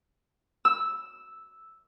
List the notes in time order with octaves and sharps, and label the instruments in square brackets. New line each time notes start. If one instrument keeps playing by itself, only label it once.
[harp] E6